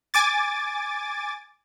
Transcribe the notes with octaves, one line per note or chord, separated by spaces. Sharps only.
G#5 D6 A6